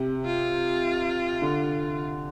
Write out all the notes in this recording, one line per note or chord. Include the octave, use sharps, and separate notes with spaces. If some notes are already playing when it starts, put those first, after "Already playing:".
Already playing: C3
F4
D3